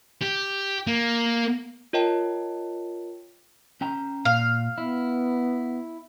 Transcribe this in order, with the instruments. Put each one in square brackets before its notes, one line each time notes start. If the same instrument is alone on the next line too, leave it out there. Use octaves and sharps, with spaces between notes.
[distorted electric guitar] G4
A#3
[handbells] F4 A#4 C#5 D#5 G5 A5
[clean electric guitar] C#4 G5 A#5
[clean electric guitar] A#2 [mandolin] F5
[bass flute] B3 [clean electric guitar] E4